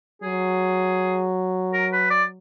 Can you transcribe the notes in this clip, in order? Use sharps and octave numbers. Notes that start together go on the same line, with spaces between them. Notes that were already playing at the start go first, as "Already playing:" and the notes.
F#3 G#4
A#4
B4
D5